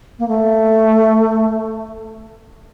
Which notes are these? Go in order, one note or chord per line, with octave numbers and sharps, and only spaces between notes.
A#3
A3